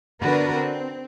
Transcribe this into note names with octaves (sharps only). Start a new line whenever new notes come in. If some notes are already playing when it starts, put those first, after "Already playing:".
D3 B3 D4 F#4 A#4 B4
C4